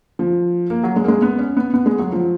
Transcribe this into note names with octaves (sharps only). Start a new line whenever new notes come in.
F3
A#3
F#3
G#3
A#3
G#3
B3
C#4
B3
B3
G#3
F#3
F3